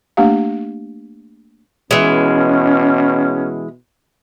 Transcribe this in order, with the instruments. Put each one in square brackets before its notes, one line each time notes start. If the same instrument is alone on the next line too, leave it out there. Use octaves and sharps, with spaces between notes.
[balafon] A3 A#3 D4 G4 F5
[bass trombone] B2 [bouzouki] E3 G#3 [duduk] C#4